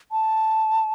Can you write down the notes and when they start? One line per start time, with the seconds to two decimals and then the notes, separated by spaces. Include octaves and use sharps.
0.11 A5